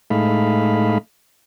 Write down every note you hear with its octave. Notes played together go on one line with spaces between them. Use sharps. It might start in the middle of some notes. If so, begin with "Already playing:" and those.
A2 G#3 A3 D#4 F5 B5